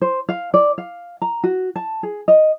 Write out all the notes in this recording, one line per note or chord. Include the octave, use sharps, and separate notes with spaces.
C5
F5
D5
F5
A#5
F#4
A5
G#4
D#5